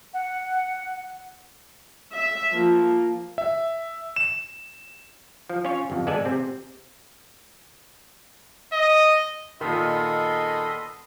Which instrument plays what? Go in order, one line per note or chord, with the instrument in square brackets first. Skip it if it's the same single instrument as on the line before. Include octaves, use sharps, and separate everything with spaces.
[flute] F#5
[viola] E5
F3 A#3
[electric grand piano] E5
E7
[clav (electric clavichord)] F3
C#4 F4 C#5
G1 F2
G#1 G#3 B3 A4 D5 G#5
C3 C4
[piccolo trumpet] D#5
[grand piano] A#2 D#3 [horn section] B3 G#4 D#5 [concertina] A4 B5 C6